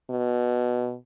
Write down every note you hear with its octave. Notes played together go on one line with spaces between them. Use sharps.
B2